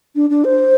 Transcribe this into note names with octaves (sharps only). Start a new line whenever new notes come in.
D4
D4
C5